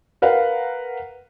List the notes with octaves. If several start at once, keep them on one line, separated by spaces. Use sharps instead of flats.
A#4 B4 F5 F#5